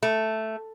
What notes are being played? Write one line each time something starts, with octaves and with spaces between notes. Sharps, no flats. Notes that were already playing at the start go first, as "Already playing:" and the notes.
A3